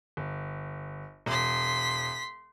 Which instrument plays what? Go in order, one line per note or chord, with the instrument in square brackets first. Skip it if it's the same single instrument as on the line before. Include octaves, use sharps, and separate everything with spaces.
[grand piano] G1
[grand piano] E1 [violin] C6 B6